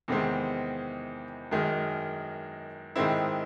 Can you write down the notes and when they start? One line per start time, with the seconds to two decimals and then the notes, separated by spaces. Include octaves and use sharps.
0.08 E2 C3 D#3 G#3 C4
1.51 F#2 D#3 G#3
2.96 G#2 D#3 G#3 C4 E4